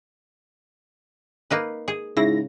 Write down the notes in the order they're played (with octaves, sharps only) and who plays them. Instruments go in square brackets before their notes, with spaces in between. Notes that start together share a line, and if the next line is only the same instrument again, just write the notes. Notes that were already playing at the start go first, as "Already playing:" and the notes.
[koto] A#3 D#4 B4
G#4
[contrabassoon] G#2 [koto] C#3 [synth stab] E4 A#6